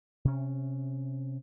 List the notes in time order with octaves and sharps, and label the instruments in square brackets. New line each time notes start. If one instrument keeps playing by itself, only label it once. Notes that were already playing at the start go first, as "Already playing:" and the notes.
[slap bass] C3 C#4